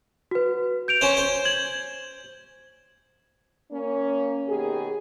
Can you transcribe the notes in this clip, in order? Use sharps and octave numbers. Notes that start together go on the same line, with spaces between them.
F#4 B4
G6 D7 F7
C#4 C5
C5
G#6 F#7
A#3 C#4
B2 D#3 G4 G#4